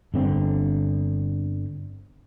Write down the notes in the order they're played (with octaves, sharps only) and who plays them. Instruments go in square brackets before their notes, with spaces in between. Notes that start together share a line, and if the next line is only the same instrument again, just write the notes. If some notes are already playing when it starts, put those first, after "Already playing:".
[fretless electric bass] G1 D3 C4